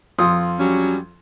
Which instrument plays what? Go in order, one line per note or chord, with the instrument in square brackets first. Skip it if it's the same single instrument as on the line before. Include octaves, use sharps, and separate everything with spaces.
[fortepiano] F2 F4 D#6
[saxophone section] F#3 G3 C#4